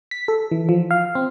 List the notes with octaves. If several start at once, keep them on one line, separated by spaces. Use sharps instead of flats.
B6
A4
E3
F3
F5
C4